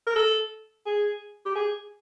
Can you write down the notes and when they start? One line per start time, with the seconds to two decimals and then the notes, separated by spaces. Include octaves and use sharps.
0.07 A#4
0.16 A4
0.86 G#4
1.45 G4
1.56 G#4